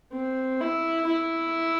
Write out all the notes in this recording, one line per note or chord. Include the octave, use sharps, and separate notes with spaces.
C4
E4
E4